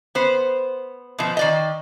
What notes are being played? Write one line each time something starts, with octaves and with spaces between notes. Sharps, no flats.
B3 C5
B2 F3
D#3 D5 D#5